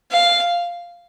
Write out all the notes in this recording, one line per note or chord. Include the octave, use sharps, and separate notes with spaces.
F5